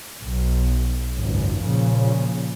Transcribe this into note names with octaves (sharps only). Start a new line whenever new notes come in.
B1
G#1 C#2 F#2
A#2 C#3 F3